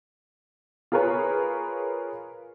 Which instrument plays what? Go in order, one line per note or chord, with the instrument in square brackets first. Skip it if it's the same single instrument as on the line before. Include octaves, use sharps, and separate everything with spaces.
[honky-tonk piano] F4 G#4 A#4 B4 C#5